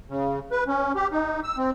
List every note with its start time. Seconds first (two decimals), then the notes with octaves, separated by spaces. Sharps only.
0.10 C#3
0.51 B4
0.68 C#4
0.96 G4
1.12 D#4
1.44 E6
1.58 C4